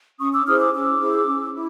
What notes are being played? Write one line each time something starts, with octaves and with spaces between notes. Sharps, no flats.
C#4 C#6 D#6
D6 E6
E4 G#4 C5 D#6 F6
D6 E6
C#4 D6 E6
E4 G#4 C5
C#4
E4